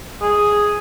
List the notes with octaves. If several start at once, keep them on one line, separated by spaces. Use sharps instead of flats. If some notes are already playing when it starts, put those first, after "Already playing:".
G#4